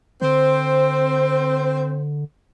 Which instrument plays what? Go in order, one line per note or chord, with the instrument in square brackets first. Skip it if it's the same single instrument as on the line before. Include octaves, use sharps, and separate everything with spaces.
[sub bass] D3 [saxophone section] C4 C5